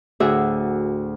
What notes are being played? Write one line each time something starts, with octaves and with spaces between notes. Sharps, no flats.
D2 A2 F#4 G#4 E5